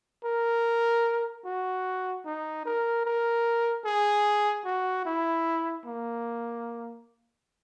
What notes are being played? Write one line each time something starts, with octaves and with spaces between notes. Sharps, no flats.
A#4
F#4
D#4
A#4
A#4
G#4
F#4
E4
A#3